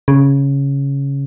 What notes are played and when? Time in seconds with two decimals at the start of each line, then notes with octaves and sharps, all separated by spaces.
0.08 C#3